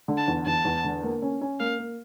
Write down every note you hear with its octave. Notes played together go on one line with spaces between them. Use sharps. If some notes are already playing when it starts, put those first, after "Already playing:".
D3
A5
E2
E2 A5
E2
D3
A#3
C#4
C#4
A#3 F5
A#3